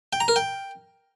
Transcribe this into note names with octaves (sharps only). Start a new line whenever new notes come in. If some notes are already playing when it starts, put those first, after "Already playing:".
G5
A#5
A#4
G5